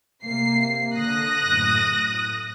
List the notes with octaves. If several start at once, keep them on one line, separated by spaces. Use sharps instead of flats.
C3 A#3 C7
D3 D#6 F#6 A#6
F#2 A2
A2